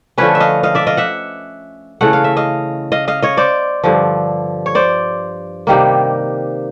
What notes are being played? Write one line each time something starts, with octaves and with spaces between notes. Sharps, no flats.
D3 F3 A3 C#4 B4 C#5
E5
D#5 F5
D#5 F5
D5 E5
D#5 F5
E5 F#5
C#3 E3 A3 F#5
F5
E5
D#5 F5
D#5 F5
D#5 F5
C#5 D#5
C5 D5
G2 D3 F3
C#5
C5 D5
C3 D#3 G3 A#3